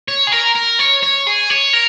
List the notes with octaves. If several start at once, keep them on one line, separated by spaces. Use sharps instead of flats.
C#5
G#4
A#4
A#4
C#5
C#5
G#4
C#5
A#4